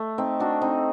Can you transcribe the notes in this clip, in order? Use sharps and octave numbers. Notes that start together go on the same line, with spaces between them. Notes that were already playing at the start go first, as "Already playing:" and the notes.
Already playing: A3
C4 D#4
D4 F#4
C4 D#4